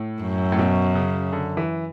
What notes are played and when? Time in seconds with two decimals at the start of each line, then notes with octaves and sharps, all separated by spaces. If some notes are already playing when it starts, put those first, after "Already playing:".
Already playing: A2
0.22 F#2
0.52 A2
0.59 B2
0.95 C#3
1.33 D3
1.57 E3